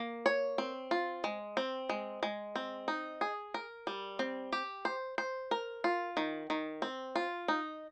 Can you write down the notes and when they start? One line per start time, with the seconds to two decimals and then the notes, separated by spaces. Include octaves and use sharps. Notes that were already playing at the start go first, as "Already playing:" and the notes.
Already playing: A#3
0.26 C#5
0.58 C4
0.91 F4
1.24 G#3
1.57 C4
1.89 G#3
2.23 G#3
2.56 C4
2.88 D#4
3.21 G#4
3.54 A#4
3.87 G3
4.19 C4
4.52 G4
4.85 C5
5.18 C5
5.51 A#4
5.84 F4
6.17 D#3
6.50 D#3
6.82 C4
7.16 F4
7.48 D#4